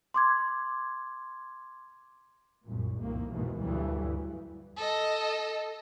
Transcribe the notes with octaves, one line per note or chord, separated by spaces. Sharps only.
C6 D6 G#6
C2 F#2 A#2
C2 F2 A2 D#3 A#3
D#2 G#2 B2 D#3 E3
D2 G2 E3 F#3 G3
A4 D#5